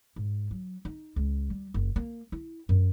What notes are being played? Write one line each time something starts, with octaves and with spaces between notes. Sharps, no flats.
G#2
F#3
D#4
C#2
G3
F#1
A#3
E4
F#2